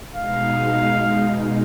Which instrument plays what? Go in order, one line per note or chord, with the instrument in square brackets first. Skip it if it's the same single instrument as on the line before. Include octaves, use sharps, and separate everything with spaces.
[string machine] B2 G#3 D#4 [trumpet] F5